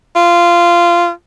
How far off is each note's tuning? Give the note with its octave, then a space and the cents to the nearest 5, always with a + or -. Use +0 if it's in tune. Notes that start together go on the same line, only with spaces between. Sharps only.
F4 -15